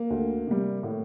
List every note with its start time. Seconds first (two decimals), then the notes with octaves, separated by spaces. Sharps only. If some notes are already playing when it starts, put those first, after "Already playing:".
Already playing: A#3
0.10 D2
0.47 C3 G3
0.83 A2